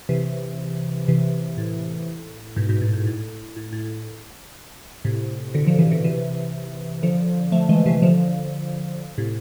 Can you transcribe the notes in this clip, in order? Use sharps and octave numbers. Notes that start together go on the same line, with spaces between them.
C3 E3
C3 E3
A2
G#2 B2
G#2 B2
A2
G#2
A2
A2
A2
A2 C3
B2 D3
D3 F3
C3 E3
B2 D3
C3 E3
D3 F3
F3 A3
E3 G#3
C3 E3
D3 F3
A2 C3